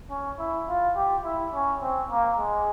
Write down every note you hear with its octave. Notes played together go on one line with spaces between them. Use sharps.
C#4
E4
F4
G4
E4
C#4
C4
A#3
G#3